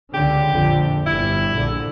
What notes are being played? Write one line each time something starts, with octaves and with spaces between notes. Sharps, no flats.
C#2 D3 G4
A#1 F2 D3
G1 G3 E4
A#1 D3